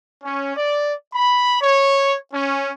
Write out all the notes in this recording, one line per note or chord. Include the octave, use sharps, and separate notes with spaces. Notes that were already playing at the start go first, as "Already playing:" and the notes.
C#4
D5
B5
C#5
C#4